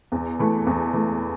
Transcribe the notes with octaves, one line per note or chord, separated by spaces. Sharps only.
E2
E3 A3
E2
E3 A3